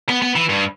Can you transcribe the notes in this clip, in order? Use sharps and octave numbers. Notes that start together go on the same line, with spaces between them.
B3
B3
E3
G2